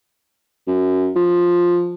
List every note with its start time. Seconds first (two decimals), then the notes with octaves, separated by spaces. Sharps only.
0.68 F#2
1.16 F3